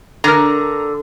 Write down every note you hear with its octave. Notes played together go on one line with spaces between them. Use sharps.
D3 A#4 A#5